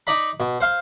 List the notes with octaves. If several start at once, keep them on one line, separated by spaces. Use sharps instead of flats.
D#4 D5 D#5 B5
B2
C5 F5 C6